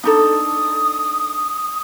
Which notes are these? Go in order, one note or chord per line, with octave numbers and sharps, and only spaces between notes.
D4 D#4 A4 D#6